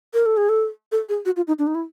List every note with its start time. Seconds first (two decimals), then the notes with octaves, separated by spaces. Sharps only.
0.14 A#4
0.26 A4
0.37 G#4
0.49 A4
0.92 A4
1.09 G#4
1.25 F#4
1.36 F4
1.48 D#4
1.59 D4
1.67 D#4
1.75 E4